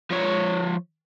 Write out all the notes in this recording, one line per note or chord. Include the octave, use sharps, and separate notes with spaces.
F3 C#5